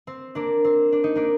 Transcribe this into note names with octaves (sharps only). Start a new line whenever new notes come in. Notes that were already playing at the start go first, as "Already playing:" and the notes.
C4
A#3 D4
C4
D4
D#4
A#3 D4